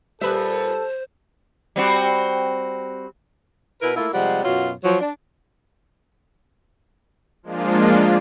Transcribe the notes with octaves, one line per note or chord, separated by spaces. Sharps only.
A#2 G3 A4 B4 C5 E5
G3 C4 F#4
B2 E4 A#4 B4
A3 A#3 E4 F4
C3 F3 G3 G#3 F#5
F#2 B2 F4 F#4 C#5
F3 F#3
D4
F3 G#3 A#3 D4 F4